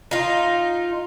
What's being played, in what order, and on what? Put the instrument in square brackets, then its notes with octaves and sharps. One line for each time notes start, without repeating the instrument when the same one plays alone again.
[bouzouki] D#4 F4